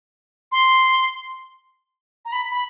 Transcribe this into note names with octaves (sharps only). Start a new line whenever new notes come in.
C6
A#5
B5
B5